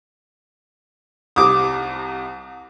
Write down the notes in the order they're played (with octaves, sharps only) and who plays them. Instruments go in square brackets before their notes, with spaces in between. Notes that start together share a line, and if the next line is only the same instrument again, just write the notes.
[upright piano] C2 C3 [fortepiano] D6 D#6